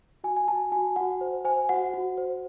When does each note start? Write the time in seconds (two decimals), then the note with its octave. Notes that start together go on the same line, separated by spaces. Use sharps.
0.24 F#4 G#5
0.37 G#5
0.48 F#4 A5
0.72 F#4 G#5
0.96 F#4 F#5
1.21 C5
1.45 C5 G#5
1.69 F#4 F#5
1.94 F#4
2.18 C5